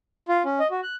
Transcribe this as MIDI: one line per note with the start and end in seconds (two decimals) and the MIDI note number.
0.28 0.43 65
0.45 0.59 61
0.59 0.67 75
0.71 0.81 66
0.83 0.96 90